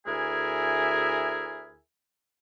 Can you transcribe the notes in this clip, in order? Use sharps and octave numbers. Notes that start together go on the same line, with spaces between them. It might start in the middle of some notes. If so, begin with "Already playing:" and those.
D2 E4 G#4 A#4 E5 G#5